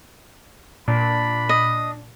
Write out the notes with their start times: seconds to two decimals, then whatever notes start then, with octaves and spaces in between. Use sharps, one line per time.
0.88 A#2 D4 B5
1.49 D#5